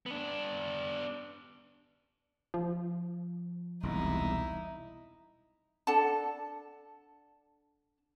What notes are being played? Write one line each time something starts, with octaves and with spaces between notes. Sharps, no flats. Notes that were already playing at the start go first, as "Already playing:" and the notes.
B3 D4
F3
E1 C2 D#4 E4
D4 A4 F#5 A5